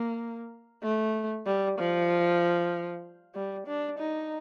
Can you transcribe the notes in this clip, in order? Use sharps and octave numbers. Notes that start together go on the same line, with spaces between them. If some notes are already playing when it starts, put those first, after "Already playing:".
Already playing: A#3
A3
G3
F3
G3
D4
D#4